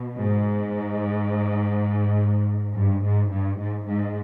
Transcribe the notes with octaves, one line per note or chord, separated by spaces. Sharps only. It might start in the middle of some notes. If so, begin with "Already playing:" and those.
Already playing: B2
G#2
G2
G#2
G2
G#2
G#2